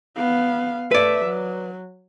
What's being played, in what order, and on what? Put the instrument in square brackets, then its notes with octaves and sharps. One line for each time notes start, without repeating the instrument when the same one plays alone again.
[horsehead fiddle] B3 F5
[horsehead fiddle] A3 E5 [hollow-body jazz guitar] B4 D5
[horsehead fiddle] F#3